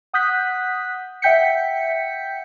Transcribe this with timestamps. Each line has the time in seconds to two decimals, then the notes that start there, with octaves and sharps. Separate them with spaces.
0.13 F#5 D#6 F#6 G6 B6
1.22 E5 F#5 G5 G6 B6 C#7